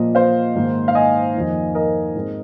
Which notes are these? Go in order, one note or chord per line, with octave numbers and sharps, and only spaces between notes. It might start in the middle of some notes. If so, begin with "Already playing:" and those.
Already playing: A#2 F3 A#3 D#5
C5 F5
G#2 D#3 A#3
F5
D#5 G#5
F2 D#3 A#3
A#4 D#5
G#2 G#3 C4